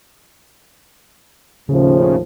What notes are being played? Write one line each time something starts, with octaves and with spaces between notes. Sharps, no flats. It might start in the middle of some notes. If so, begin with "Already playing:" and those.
D#2 A2 C#3 F3